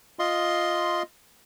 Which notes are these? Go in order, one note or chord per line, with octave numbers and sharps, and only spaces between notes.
F4 D#5 C6